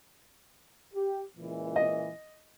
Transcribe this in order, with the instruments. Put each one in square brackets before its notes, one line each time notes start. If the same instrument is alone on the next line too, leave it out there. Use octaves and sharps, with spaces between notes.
[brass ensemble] G4
C#2 A#2 E3
[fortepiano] D#5